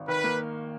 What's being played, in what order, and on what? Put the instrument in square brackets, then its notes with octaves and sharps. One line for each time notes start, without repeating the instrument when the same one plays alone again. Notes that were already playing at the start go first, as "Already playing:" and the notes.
Already playing: [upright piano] G#1
[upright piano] D#3 [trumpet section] B4
[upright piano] A#3